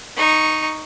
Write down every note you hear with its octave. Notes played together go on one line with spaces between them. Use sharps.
D#4 C#6